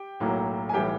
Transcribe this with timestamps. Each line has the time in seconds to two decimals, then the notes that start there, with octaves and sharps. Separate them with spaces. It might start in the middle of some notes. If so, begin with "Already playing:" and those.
Already playing: G4 G5
0.20 B1 A2 F#3 A#3
0.69 G#5
0.73 B1 A2 E3 G3 G4 G5